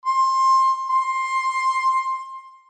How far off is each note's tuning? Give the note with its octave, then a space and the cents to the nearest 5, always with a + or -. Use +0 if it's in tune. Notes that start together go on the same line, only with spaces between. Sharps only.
C6 +20
C6 +15